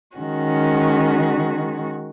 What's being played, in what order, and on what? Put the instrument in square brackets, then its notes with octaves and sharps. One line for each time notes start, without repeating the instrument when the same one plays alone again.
[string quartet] D#3 G#3 C#4 F#4